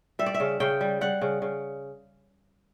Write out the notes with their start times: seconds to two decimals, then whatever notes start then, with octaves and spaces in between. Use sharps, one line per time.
0.19 G3 E5
0.26 D5
0.34 E5
0.40 C#3
0.60 C#3 G5
0.81 G3
1.01 G3 F#5
1.21 C#3
1.42 C#3